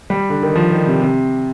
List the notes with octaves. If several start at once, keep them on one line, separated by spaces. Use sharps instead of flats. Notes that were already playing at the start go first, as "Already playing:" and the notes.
G3
D3
D#3
F3
D#3
C3
C3